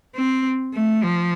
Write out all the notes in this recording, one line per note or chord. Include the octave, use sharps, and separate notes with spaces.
C4
A3
F3